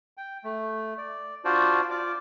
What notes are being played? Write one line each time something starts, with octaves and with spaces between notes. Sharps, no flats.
G5
A3
D5
D4 F4 F#4 C5 D5
F4 D5 D6